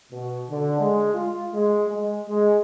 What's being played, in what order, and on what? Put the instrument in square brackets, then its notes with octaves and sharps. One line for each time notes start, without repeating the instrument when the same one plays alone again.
[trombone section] B2
D3
G#3
F4
G#3
G#3
G#3